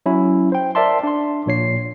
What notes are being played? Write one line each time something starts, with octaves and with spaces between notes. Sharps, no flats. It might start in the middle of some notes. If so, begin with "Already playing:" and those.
F#3 C#4 E4
C5 G5
A#4 D5 E5 A5 C6
D4 C6
A#1 A#2 C#5 C7